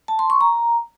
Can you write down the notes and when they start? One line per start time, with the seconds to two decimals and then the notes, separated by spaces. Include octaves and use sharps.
0.08 A5
0.19 C6
0.30 C#6
0.41 A#5